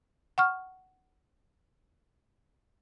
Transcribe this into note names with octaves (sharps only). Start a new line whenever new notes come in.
F#5 C#6 F6